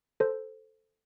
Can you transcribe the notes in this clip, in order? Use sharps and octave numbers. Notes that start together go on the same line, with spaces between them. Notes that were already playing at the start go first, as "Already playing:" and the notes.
A4 C5